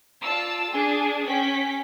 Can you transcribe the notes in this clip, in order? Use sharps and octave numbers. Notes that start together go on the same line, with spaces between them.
F4 D5 A5 E6
D4 G#4
C#4 G5 B6